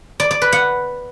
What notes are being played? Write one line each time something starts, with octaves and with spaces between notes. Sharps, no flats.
D5
D5
B4
F#5